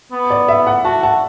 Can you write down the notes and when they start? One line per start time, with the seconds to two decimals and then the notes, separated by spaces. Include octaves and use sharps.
0.12 B3
0.30 D5
0.48 E5
0.67 F#5
0.85 F#4 A5
1.03 A5